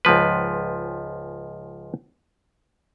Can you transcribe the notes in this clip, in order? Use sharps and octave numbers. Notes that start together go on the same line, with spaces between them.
C#2 G#2 F3 B4